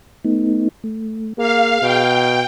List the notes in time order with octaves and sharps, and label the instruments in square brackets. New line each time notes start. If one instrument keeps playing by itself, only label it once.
[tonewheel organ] A3 B3 D#4
A3
[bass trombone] A#3 [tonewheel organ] G#4 [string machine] F5
[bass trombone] B2 [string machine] G5